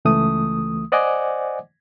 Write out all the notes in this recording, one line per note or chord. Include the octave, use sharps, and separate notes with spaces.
C#2 E3 A3 D#6
C5 D5 D#5 F#5 G#5 D6